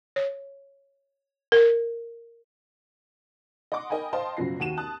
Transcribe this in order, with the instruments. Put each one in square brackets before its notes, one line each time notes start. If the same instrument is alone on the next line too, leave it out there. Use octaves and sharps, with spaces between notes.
[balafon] C#5
A#4
[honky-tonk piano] D#5 F#5 C6 D6
A#4 D#5 G5 G#5 B5
C5 D#5 F5 G5 A5 C6
F#1 F#2 B2 F3 A#6 C7
D#2 F#4 D#7 E7
A5 D#6 F#6